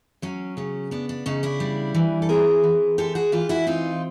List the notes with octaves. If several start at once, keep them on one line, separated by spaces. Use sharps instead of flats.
F#3 C#4
C#3 C#4
B3 D4
D4
C#3 C#4 D#4
D4 E4
G3
E3
A4
C4 G#4 A#4
E3
G#3 G4 A4
F#4 G#4
E3 F4 G4
E4 F#4
C4 D#4 F4